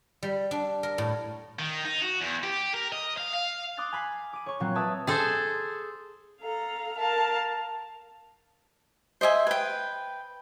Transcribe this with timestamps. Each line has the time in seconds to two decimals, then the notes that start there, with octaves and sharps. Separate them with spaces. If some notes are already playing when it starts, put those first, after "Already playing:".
0.23 G3
0.51 D4
0.83 A#4
0.98 A2
1.59 D#3
1.85 D#4
2.02 F#4
2.21 E2
2.43 G4
2.74 A#4
2.92 D#5
3.17 F5
3.33 F5
3.77 C6 D6 D#6 F#6 A6
3.92 G#5 B5 F6 C7
4.33 D6 D#7
4.46 C#5 C#6
4.60 A#2 F#3 C4 F4 F#6
4.75 B4 C#5 D5 E5 A5 D#6
5.07 G#4 A4 C5
6.42 A4 F5 A#5
6.97 A#4 F5 A5
9.21 C5 D#5 E5 G#5
9.47 B4 G5